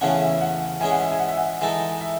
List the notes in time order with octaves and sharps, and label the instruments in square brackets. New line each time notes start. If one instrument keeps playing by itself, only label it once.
[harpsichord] E2 C#3 E3 A3 C#4 [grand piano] F#5
[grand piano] E5
F#5
[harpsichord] E3 G#3 C#4 G#4 [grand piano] G#5
[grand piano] F#5
E5
G#5
F#5
E5
F#5
[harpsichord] E3 G#3 D#4 A4
[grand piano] E5